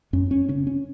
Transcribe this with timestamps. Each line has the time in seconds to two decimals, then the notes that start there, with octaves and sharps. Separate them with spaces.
0.13 F#2 C#4
0.31 C#4
0.48 C#3 C#4
0.67 C#4